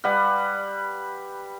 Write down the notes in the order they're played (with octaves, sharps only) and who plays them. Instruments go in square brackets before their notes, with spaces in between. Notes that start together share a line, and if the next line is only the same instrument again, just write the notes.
[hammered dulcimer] G3 B4 F#5